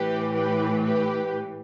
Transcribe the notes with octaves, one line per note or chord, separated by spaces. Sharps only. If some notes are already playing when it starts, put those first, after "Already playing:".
Already playing: A2 E3 G4 B4
G4 B4
G4 B4